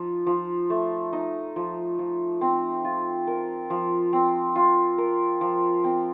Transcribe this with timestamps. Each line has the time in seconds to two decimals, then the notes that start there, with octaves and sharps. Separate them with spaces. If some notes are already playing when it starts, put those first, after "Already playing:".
Already playing: F3 D#4
0.27 F3
0.70 A3
1.13 D#4
1.56 F3
1.99 F3
2.41 C4
2.84 F4
3.27 A#4
3.70 F3
4.13 C4
4.56 F4
4.98 A#4
5.41 F3
5.84 C4